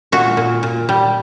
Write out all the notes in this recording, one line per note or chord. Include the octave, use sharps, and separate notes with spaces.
A#2 F#4
A#2
A#2
G3